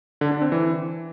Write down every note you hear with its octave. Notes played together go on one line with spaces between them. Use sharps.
D3
D4
C4
E3